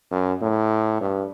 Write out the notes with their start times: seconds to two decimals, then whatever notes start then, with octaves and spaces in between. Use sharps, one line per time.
0.11 F#2
0.42 A2
1.01 G2